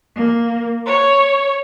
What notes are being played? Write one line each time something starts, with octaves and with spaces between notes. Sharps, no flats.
A#3
C#5